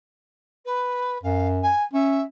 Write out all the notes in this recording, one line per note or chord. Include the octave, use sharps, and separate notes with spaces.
B4
F#2 F5
G#5
C#4 E5